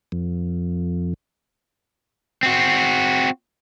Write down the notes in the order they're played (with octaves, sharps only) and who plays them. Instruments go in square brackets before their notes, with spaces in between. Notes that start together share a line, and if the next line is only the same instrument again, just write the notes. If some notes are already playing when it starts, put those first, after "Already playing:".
[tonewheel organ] F2
[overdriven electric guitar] C4 F#4